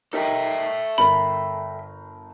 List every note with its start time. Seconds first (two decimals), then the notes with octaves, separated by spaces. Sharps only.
0.13 D#4 G4 A4 A#4 E5 G5
0.98 G1 A#4 B5